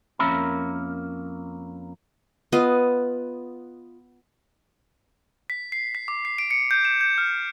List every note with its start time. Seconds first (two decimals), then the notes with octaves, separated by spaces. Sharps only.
0.19 F2 A#3 C#4 A#4 E5 B5
2.52 B3 F4 D#5
5.50 B6
5.72 C7
5.95 B6
6.08 D6
6.25 C7
6.38 D7
6.51 C#7
6.71 G6
6.85 E7
7.01 G6
7.18 F6